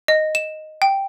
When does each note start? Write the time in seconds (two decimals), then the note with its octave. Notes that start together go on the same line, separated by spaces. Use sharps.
0.08 D#5
0.35 E7
0.82 G5